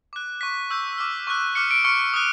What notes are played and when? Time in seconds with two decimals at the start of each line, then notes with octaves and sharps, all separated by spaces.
0.13 D6 F#6
0.41 C#6 F#6 B6
0.70 C#6 E6 G6
0.98 D6 F6
1.27 C#6 F#6
1.55 D6 F6 C#7
1.71 D7
1.85 C#6 F6 C#7
2.13 D#6 F#6